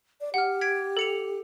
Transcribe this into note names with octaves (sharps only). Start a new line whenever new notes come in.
D5
G4 F#5 F6
G#6 B6 D7
A4 C#7 F7